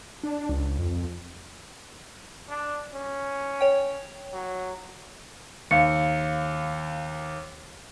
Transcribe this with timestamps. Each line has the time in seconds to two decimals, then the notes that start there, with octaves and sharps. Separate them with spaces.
0.23 D4
0.49 C#2
0.79 F2
2.49 D4
2.94 C#4
3.61 C#5 G5
4.33 F#3
5.71 D#2 F5 C#7